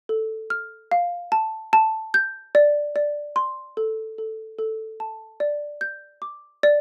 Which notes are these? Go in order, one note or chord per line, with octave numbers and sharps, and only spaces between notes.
A4
F6
F5
A5
A5
G6
D5
D5
C6
A4
A4
A4
A5
D5
G6
D6
D5